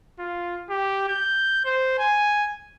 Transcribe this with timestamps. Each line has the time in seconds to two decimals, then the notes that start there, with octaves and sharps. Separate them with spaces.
0.19 F4
0.70 G4
1.09 G6
1.65 C5
1.99 G#5